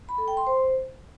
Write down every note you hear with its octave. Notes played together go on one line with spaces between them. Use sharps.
B5
A4
G5
C6
C5